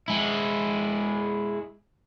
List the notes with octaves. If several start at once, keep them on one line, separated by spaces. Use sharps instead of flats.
G#3 E4